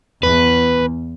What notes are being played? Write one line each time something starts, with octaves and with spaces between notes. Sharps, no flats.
E2 B4